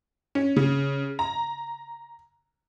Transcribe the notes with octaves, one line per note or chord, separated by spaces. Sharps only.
C#4
C#3
A#5